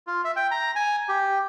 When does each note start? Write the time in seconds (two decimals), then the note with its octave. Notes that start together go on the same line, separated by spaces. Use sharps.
0.07 F4
0.24 E5
0.36 G5
0.51 A#5
0.76 G#5
1.09 G4